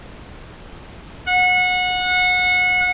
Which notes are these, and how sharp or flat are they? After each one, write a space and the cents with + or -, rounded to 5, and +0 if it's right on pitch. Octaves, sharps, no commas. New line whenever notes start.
F#5 -25